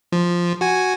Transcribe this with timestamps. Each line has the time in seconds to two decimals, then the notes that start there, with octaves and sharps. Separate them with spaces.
0.12 F3
0.61 F#4 G#5